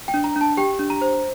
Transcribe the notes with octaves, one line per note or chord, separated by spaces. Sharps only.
G5
D4
A#5
D4 A5
G4 G5
D4
A#5
C5